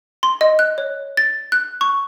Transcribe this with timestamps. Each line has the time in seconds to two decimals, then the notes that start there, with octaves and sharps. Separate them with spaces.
0.23 C6
0.41 D#5
0.59 F#6
0.78 C#5
1.17 A6
1.52 F#6
1.81 C#6